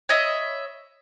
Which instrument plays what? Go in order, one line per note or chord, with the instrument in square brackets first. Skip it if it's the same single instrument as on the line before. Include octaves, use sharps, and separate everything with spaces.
[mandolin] C#5 D#5 E5 B5